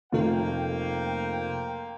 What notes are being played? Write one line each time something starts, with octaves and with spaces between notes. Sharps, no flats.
F1 A3 A#3 F4 C5 G5